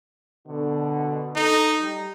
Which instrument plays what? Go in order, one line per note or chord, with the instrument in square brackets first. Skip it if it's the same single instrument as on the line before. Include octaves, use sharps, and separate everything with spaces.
[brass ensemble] B2 D3
[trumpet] D#4 [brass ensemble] A4
[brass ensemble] G3